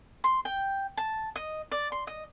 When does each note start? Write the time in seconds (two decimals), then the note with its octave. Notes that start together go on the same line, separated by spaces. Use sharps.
0.24 C6
0.45 G5
0.97 A5
1.36 D#5
1.71 D5
1.92 C6
2.07 D#5